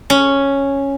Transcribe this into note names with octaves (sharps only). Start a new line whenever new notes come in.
C#4